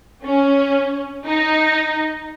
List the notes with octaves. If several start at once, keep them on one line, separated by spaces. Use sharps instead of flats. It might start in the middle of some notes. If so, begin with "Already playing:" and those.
C#4
D#4